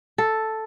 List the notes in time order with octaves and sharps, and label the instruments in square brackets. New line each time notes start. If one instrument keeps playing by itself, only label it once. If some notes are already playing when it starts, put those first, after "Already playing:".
[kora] A4